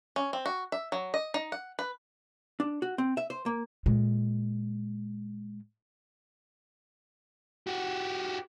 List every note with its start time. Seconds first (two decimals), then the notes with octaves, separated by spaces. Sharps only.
0.16 C#4
0.33 C4
0.46 F#4
0.72 E5
0.92 F#3
1.14 D#5
1.34 D#4
1.52 F#5
1.79 B4
2.60 D4
2.82 F#4
2.98 C4
3.17 E5
3.30 C5
3.46 A#3
3.86 A#2 G#3
7.67 F#4 G4